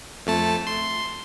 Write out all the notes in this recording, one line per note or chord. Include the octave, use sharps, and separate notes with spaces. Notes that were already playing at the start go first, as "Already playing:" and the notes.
F2 A3 A5
C6